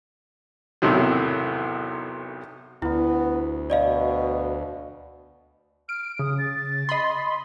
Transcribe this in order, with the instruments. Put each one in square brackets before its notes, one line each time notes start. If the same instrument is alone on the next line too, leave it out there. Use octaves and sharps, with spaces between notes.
[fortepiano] B1 E2 A2 C3 D#3 F#3
[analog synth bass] D2 [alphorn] B3 [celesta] E4
[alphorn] B2 [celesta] D5 D#5 F5
[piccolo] F6 [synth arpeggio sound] D7
[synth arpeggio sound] C#3 [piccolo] D#6
[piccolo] A6
[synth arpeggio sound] D#5 B5 C6